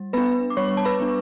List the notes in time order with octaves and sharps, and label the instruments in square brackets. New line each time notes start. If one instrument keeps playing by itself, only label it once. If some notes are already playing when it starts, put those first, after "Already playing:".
Already playing: [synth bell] G3
B3 D4 B4 B5
D6
G3 C#5 C#6
A5
B4 B5
B3 D4